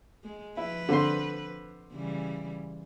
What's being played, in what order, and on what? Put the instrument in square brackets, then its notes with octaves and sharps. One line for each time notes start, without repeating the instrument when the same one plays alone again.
[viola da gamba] G#3
[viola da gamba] F3 B4 [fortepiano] E4
[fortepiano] D3 C4 C6
[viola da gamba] C#3 E3 G3